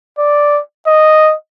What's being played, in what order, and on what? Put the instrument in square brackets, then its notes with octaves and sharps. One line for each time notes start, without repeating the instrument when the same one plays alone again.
[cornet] D5
D#5